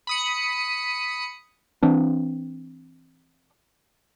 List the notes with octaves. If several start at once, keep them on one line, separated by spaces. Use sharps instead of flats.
B5 D#6 C#7
E3 C4 D4